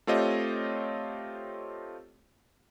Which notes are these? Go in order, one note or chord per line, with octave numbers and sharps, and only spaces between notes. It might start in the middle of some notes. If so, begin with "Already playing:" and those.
A3 C4 F4 G4 C#5 D#5